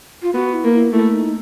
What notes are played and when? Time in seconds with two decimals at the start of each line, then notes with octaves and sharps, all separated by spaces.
0.22 F4
0.34 B3 F#4
0.53 E4
0.64 A#3
0.74 E4
0.92 A3 E4
1.12 D#4